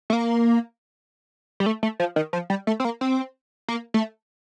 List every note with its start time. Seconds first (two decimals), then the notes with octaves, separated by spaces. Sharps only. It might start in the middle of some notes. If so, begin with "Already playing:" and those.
0.10 A3
0.13 A#3
1.60 G3
1.66 A3
1.83 A3
2.00 F3
2.16 D#3
2.33 F3
2.50 G3
2.67 A3
2.80 C4
2.85 A#3
3.01 C4
3.68 A#3
3.94 A3